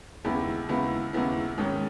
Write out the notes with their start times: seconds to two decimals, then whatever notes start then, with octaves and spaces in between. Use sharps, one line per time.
0.24 D#2 C#3 G#3 B3 E4
0.69 D#2 C#3 G#3 B3 E4
1.13 D#2 C#3 G#3 B3 E4
1.57 G#2 D#3 G#3 C#4